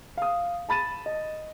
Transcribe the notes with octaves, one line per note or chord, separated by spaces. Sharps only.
F5 D#6
A5 B5 A6 D#7 E7
D#5